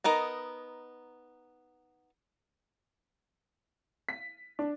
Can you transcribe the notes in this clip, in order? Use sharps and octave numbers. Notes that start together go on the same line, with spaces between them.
B3 D#4 A#4 D#5
B6
D4